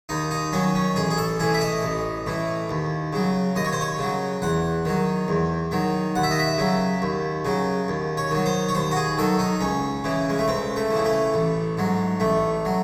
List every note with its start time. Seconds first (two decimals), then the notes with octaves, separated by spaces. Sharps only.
0.09 D#2 D#4
0.31 D#4
0.52 D#3 F#3 C#4
0.75 C#4
0.96 A1 G#4
1.11 G#4
1.17 A4
1.40 A2 E3 G#4
1.54 E5
1.61 D#5
1.83 A1
2.26 A2 E3
2.69 D#2
3.13 C#3 F#3
3.55 D#2 D#5
3.65 C#5
3.73 C5
3.81 C#5
3.99 C#3 F#3
4.42 E2 F#5
4.85 D#3 F#3
5.28 E2
5.71 D#3 F#3
6.16 D#2 F#5
6.23 E5
6.31 D#5
6.39 E5
6.58 C#3 F#3
7.02 D#2
7.45 C#3 F#3
7.88 D#2
8.17 C#5
8.31 D#3 F#3
8.46 C5
8.69 C#5
8.75 D#2 C5
8.91 F#4
8.96 G#4
9.18 D#3 F#3 A4
9.39 D#4
9.61 C#2 C#4
10.04 C#3 E3
10.30 G#3
10.39 A3
10.47 C#2 C4
10.76 A3
10.91 C#3 E3
11.05 A3
11.34 A1
11.78 G#2 F#3
12.20 A1 A3
12.65 F#3